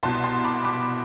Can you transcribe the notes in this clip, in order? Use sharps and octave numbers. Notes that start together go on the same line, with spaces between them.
C2 B2 A5 C6
A5 C6
B5 D6
B5 D6